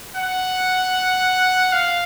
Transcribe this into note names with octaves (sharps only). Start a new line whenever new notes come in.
F#5
F5